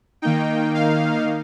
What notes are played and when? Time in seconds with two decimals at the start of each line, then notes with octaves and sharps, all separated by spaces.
0.22 D#3 A#3 D#4 G5
0.74 F5